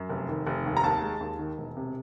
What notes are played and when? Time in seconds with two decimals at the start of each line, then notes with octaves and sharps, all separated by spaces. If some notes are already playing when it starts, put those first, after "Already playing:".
Already playing: F#2
0.09 F1
0.29 D#3
0.47 F1
0.66 D#2
0.77 A#5
0.83 D#2 A5
1.02 G#3
1.21 D#2
1.39 D#3
1.58 E1
1.77 C3